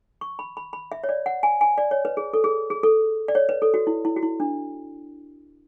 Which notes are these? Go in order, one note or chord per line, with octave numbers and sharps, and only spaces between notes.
C#6
B5
B5
B5
E5
C#5
D5
F#5
G#5
G#5
D5
C#5
B4
G#4
A4
G#4
G#4
A4
D5
C#5
B4
A4
F#4
E4
E4
F#4
E4
D4